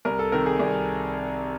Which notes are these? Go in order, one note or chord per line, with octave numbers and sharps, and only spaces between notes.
C2 A#4
A4
C3 D#3 A#4
G#4
C2